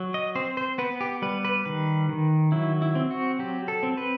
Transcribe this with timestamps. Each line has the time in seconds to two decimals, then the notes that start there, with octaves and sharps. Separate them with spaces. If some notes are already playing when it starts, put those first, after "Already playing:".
Already playing: F#3
0.14 D#5
0.35 C4 C5
0.57 C5
0.78 B3 B4
1.01 G4
1.22 G3 B4
1.45 B4
1.65 D#3 B4
2.09 D#3
2.52 F#3 E4
2.82 E4
2.95 C4
3.11 F#4
3.39 F#3 G4
3.68 A4
3.83 C4
3.97 B4